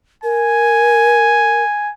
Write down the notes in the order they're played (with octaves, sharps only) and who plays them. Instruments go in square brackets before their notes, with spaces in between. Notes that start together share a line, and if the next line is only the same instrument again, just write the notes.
[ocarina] A#4 [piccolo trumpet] G#5